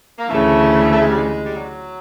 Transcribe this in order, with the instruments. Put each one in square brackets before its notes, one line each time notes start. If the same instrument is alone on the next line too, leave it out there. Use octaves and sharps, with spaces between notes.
[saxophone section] A#3
[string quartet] D2 C#3 E3 [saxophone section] A3
[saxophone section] A3
G#3
G3
G#3
G3
F#3